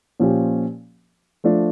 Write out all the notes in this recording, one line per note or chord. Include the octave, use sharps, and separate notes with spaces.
A#2 F3 C#4 G4
F3 A3 D4 F4